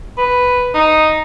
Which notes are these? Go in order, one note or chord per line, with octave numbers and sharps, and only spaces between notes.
B4
D#4